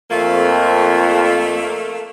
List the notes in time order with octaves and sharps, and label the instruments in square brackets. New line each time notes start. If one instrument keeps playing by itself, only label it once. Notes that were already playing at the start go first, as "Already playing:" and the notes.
[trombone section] F2 [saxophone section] A3 A#3 [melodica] F4